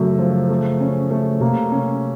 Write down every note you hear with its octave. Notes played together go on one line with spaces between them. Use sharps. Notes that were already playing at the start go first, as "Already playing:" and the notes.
Already playing: F#2 C#3 A3
F3
A3
C#4
A3
C3 A#3
C#4